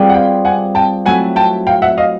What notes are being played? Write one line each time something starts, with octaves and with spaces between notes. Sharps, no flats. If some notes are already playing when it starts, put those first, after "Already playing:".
Already playing: G3 C4 F4 G#4 B4
F#5
F5 G5
F#5 G#5
G5 A5
F#3 A3 C4 E4 A4 F#5 G#5
G5 A5
F5 G5
E5 F#5
D#5 F5